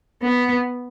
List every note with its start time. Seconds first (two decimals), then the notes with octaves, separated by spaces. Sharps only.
0.22 B3